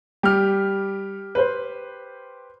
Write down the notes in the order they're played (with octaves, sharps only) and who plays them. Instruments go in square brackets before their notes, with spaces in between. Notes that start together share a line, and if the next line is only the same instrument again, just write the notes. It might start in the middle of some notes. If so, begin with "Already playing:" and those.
[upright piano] G3 [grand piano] G4 F6
[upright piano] B4 C5